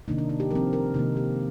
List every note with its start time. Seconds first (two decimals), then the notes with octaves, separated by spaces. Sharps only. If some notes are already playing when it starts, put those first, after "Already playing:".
0.08 C3 D#3 A#3 D4 D#4
0.18 D4
0.29 D#4
0.40 G4
0.51 F3 C4 A#4
0.73 A#4
0.94 C3 D#3 A#3 D#4
1.17 G4